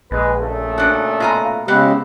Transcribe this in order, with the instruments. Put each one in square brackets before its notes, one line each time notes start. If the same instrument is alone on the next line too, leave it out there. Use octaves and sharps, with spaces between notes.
[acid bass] A#1 [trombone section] G#3 B4
[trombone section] A#2 C#3 A3
[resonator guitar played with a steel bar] D4 F#4
[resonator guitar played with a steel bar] B2 G#5 A#5 [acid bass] F4
[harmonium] C#3 G#3 G4 [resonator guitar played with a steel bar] B3 C4